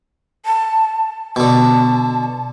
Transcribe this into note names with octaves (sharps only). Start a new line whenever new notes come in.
A5
B2 D3 A5